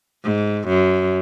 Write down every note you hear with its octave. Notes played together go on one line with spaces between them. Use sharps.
G#2
F#2